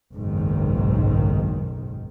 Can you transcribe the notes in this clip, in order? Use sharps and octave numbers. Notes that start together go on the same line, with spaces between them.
F#1 B1 G#2 D#3